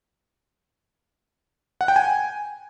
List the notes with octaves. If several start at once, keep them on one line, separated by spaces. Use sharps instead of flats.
F#5
G5
G#5